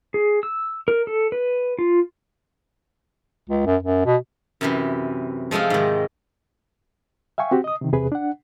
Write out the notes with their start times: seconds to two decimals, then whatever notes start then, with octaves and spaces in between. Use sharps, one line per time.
0.14 G#4
0.43 E6
0.88 A#4
1.07 A4
1.32 B4
1.79 F4
3.49 C#2
3.66 F#2
3.83 F#2
4.06 B2
4.61 F#2 C3 E3
5.51 F3 G#3 A3 C4 F4
5.70 G#2 D#3
7.38 E5 F5 G5 G#5 C#6
7.51 C4 F#4 G4
7.64 D#5 D#6
7.81 C3 D#3
7.92 E2 C3 G#4 B4
8.12 D4 F#5